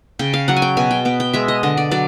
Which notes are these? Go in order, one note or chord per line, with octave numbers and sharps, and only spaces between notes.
C#3 G5
F5
F#3 F#5
G#5
G5
B2 G#5
G5
B3 G5
G5
G#3 E5
D#5
D3 D#5
D5
F#3 D5